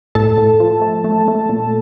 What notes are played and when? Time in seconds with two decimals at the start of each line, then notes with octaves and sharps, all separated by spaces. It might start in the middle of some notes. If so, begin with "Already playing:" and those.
0.15 A2 A4 A5
0.38 A2
0.60 F3
0.82 A3
1.04 A3
1.28 A3
1.49 A#2